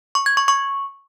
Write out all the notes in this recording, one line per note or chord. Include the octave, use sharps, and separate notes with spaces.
C#6
G#6
C#6
C#6